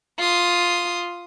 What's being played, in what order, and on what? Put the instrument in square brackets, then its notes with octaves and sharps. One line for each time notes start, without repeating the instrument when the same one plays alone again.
[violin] F4 D#6